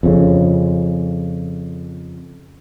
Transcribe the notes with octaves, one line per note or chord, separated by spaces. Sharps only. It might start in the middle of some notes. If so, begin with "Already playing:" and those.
F2 C#3